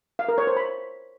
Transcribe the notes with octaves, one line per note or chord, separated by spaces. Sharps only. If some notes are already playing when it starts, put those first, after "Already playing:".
F5
A#4
C#5
C5
B5